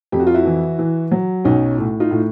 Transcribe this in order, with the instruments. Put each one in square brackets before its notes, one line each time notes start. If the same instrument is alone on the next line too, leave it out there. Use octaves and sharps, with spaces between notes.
[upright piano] F2 G4
F#4
F4
E4 F#4
E3
E3
F#3
B1 C#4 D#4
A2
D#4 F4
A2